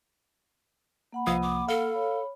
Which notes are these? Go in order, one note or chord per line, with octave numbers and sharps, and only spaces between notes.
A#3 F#5 B5
C2 F3 F5 D#6
D6
A4 F5
C#5 B5